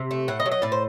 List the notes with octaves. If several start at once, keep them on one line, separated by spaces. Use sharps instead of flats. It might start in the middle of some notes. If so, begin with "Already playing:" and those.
Already playing: C3
A3
A2 F#5
D#5
F#3
D#5
A2 D5
C5